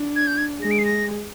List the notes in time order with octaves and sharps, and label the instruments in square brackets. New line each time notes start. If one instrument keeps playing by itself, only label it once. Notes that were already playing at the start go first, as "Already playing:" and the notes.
Already playing: [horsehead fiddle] D4
[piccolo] G#6
G6
G#6
[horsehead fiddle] G#3 [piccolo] A#6
[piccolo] D7
C7
A#6